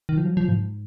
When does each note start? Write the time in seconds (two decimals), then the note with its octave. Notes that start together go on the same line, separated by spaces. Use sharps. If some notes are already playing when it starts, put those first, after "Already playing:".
0.09 D#3
0.17 F3
0.25 F#3
0.37 F3
0.49 G#2